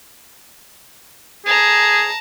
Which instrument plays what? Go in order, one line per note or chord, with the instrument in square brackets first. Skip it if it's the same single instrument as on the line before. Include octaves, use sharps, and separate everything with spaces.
[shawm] G#4 [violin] A5 A#5